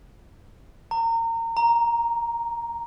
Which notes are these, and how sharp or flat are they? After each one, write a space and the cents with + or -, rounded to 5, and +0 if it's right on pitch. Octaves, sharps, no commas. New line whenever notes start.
A#5 -30
A#5 +5